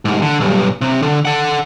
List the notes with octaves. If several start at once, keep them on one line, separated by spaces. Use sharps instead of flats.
C2 G#2
D3
B1 G2
C3
D3
A4 F#5